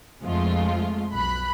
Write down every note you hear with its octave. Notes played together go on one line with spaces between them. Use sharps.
F2 F3 G#3 A3 F4
B1 B5 F#6